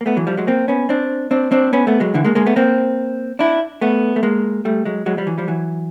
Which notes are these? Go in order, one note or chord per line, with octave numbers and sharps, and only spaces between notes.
A#3
A3 B3
E3 F#3
F3 G3
F#3 G#3
A#3 C4
B3 C#4
C4 D4
C4 D4
C4 D4
B3 C#4
A3 B3
F#3 G#3
D3 E3
G#3 A#3
G#3 A#3
A3 B3
A#3 C4
D4 E4
A3 B3
A3
G#3 A#3
G3 A3
F#3 G#3
F#3 G#3
F3 G3
E3 F#3
F3 G3
E3 F#3